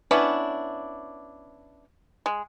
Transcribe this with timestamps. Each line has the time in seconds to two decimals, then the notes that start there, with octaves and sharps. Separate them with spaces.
0.11 B3 C#4 D4 E4
2.26 G#3